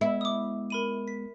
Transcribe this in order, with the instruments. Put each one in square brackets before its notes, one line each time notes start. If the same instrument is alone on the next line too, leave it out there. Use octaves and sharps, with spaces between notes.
[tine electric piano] G#3 B3 [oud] E4
[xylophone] D6 D#6
A#4 B5 D#7
B6